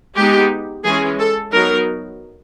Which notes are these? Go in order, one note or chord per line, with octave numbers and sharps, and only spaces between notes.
G#3 B3 D#4 G4
E3 G#3 C#4 G#4
A4
F#3 B3 D#4 A#4